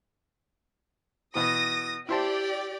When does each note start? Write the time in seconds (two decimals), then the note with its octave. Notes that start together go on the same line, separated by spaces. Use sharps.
1.35 B2 E3 D#6 A#6
2.09 E4 G4 C5 D5 A5